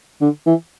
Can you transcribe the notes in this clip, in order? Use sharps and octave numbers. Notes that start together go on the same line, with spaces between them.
D3
E3